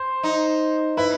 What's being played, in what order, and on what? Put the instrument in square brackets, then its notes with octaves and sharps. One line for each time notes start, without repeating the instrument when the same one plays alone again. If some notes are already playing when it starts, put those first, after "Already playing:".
Already playing: [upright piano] C5
[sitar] D#4
[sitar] E4 [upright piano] B4